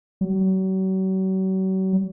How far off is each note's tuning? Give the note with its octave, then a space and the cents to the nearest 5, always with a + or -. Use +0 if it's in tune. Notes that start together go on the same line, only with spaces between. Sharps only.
F#3 +40